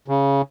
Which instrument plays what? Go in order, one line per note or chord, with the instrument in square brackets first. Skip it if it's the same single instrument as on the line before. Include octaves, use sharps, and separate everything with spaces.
[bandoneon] C#3